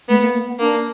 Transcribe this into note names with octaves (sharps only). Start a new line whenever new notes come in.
A3 B3
A#3
A#3
B3
A#3 D4